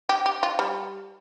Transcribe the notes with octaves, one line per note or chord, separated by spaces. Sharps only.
G4
G4
F4
G3